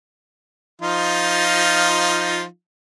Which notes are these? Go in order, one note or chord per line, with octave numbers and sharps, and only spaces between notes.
F3 D#4 F4